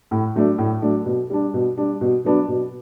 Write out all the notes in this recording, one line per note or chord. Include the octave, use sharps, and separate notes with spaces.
A2
F#3 A3 D4
A2
F#3 A3 D4
B2
G3 D4
B2
G3 D4
B2
F#3 B3 D4
B2